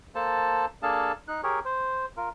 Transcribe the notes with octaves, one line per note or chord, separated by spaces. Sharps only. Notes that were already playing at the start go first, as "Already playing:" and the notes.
A#3 A4 C5 A5
A#3 D4 G#4 A4 F5 A5
D#4 F#6
G4 G#4 A#4 C#5
C5
F4 A#4